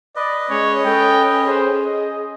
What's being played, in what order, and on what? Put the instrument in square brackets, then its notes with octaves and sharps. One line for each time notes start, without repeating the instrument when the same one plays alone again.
[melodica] B4 D#5 [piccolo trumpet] D5
[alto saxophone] G#3 [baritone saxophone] C#4 [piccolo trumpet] C#5
[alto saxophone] A4 [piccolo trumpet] G5
[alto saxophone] G#4 [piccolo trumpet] C5
[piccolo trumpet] D#5